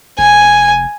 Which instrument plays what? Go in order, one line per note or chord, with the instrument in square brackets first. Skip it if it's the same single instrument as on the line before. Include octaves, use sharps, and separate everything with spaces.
[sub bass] F1 [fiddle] G#5